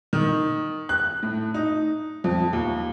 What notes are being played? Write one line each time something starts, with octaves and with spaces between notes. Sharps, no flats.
D#3
F#6
A2
D#4
F2
D#2